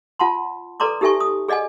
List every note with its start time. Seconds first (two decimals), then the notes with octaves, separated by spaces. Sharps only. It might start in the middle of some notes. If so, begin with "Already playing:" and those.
0.19 F4 F#5 A5 C6
0.80 A4 B4 D5 A#5 C6 D6
1.01 D#4 G4 A4 E5 G#5 C#6
1.20 D#6
1.48 G#4 D5 D#5 F#5 G#5